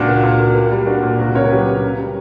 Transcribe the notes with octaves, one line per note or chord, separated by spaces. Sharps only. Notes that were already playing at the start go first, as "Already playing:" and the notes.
Already playing: C#2 A#2 D4 F#4
A#3
A#2
A#3
A#3
G3
A#3 D4 F#4
A#2
C#2 F#4 A#4
C#3 A#4 C#5
A#4
F#3 G4 B4
C#3
C#3
G3